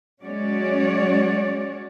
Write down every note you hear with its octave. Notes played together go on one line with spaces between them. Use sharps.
F#3 G#3 C#4 F#4 C#5 D5